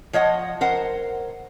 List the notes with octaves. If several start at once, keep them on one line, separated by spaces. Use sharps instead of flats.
F3 C#5 D#5 F#5
A#4 C5 F#5